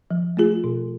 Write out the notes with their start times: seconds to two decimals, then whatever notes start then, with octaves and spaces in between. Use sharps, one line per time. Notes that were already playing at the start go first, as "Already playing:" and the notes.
0.11 F3
0.37 A3 F4 G#4
0.64 B2